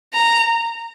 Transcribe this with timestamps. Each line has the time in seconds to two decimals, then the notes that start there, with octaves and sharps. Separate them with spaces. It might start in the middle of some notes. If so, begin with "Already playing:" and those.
0.14 A#5